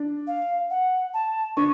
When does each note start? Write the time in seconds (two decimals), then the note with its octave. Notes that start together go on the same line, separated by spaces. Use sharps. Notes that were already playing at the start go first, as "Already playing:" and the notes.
Already playing: D4
0.27 F5
0.70 F#5
1.14 A5
1.57 D4 C#6